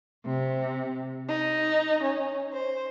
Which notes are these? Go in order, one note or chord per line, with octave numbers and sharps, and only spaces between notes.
C3
D#4
C#4
C5